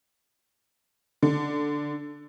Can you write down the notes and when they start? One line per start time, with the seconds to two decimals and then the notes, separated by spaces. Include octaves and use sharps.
1.23 D3